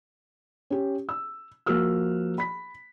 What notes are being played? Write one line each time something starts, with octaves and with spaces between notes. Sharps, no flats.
C#4 G4
E6
F3 A#3 F#4 A#4 E6 F6
B5 B6